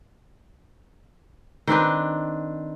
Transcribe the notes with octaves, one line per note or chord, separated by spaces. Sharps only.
D#3 C4 D4 B4